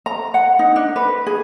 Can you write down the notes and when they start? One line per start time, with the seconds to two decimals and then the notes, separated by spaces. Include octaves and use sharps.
0.06 A#5
0.34 F#5
0.59 D#4
0.76 D4
0.96 B4
1.27 G#4